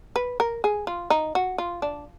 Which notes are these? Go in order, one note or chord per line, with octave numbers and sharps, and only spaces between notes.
B4
A#4
G#4
F4
D#4
F#4
F4
D4